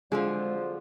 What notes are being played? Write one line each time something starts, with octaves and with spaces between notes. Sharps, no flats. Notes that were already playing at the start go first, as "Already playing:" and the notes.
F2 D3 F3 F#3 G#3 F4 G#4 C5